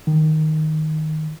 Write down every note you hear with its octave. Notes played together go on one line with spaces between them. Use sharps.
D#3